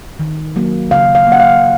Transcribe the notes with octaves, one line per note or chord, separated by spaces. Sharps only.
D#3
F#3 A#3
C#3 F5
F5
F#3 A#3 F#5
F5